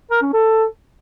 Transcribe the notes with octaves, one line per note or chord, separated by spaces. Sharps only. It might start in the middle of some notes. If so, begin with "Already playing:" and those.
A#4
C#4
A4